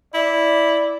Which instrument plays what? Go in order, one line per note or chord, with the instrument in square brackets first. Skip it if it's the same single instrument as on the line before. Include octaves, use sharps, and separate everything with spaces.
[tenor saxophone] E4 [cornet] D5